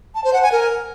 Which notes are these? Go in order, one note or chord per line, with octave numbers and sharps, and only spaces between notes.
A5
C5
F#5
G#5
A#4